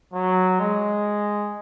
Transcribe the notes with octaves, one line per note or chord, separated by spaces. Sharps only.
F#3
G#3